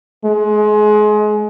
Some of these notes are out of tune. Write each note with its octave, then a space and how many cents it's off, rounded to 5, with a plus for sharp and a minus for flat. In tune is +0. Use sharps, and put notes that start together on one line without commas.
G#3 +25